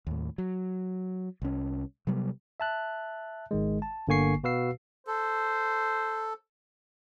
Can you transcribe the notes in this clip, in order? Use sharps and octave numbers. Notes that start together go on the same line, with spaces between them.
D#2 A2
F#3
C2 C#4
C3 F#3 G3 B3
E5 A5 F#6
G#1 D#3 G#3
A5
G1 D3 A#3 G#5 C#6 C7
B2 F#4 B4 F5 E6 C7
A4 C5